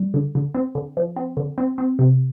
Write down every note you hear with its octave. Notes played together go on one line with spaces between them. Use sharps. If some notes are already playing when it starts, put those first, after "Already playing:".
Already playing: G3
D3
D3
C4
D3
F3
C4
D3
C4
C4
C3